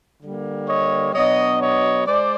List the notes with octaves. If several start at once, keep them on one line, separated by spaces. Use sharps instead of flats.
D3 G3 A#3
C#5 D#5
B2 F#3 B3 D4 C#5 D#5
C#5 D#5
G#3 C5 D5